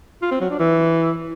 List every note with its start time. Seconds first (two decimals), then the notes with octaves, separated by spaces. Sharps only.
0.22 F4
0.31 C4
0.41 F#3
0.50 D4
0.59 E3